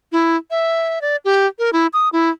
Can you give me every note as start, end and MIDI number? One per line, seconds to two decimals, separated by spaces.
0.12 0.36 64
0.51 1.01 76
1.01 1.16 74
1.25 1.46 67
1.59 1.70 70
1.73 1.87 64
1.93 2.09 87
2.12 2.29 64